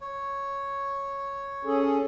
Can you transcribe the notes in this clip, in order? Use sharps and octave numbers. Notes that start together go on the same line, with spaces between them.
C#5
C#4 G#4 A4